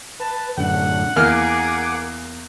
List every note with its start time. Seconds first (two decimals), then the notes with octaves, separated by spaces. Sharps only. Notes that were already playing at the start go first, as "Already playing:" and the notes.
0.20 B4 A5
0.58 F#2 A2 D3 F#5
1.16 E2 A#3 G#4 A#4 F#5 D6 F6